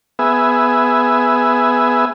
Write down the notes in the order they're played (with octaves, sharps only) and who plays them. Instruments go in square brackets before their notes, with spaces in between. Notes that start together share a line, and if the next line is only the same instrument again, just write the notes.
[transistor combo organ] B3 G#4 E5